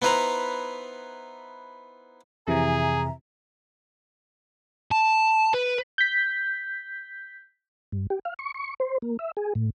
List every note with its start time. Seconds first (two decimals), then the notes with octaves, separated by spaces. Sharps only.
0.02 B3 D#4 E4 B4 C5 A#5
2.47 F2 C3 E3 G#4 E5 G#5 A#5
4.91 A5
5.54 B4
5.98 G6 B6
7.92 G2
8.10 G4
8.25 F5
8.39 C#6
8.54 C#6
8.80 C5
9.02 A#3
9.19 E5
9.37 G#4
9.55 A2